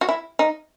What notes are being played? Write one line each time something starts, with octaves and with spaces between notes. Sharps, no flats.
F#4
E4
D#4